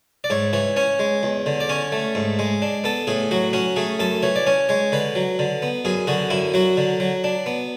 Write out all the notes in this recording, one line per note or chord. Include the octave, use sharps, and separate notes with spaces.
D5
G#2 C#5
E3 C#5
C#4 C#5
G#3
E2
D3
D5
C#4 C#5
A3
G#2
G#3
D4
B3 A4
A2 G#4
F#3 F#4
C#4 F#4
A3 G#4
F#2 A4
E3 C#5
D5
C#4 C#5
G#3 C#5
D3 B4
F#3
D3
B3
F#2 G#4
D3 F#4
F#2 E4
F#3 F#4
D3
F#3
D4
B3